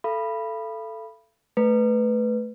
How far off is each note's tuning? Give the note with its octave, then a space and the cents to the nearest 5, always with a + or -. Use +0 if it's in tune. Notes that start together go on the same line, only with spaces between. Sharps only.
A4 +0 F5 -45 B5 -5
A3 +0 B4 +5